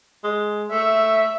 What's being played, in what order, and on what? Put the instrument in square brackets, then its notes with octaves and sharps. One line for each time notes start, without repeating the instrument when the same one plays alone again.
[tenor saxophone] G#3
[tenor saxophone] A3 [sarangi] E5